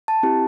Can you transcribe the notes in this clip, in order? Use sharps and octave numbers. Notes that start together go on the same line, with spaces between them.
A5
C4 E4 G4